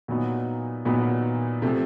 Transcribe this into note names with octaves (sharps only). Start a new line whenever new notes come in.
A#2 F#3 B3 D#4
A#2 F#3 B3 D#4
C3 F3 A3